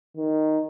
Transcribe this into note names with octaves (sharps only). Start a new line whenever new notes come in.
D#3